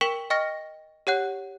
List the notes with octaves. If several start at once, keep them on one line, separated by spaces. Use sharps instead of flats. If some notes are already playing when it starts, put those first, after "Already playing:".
A#4 G5 C#6 B6 E7
D#5 G5 C#6 F6 A#6
G4 C#5 F#5 F#6